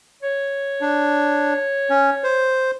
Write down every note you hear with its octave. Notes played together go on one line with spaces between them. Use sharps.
C#5
D4
C#4
C5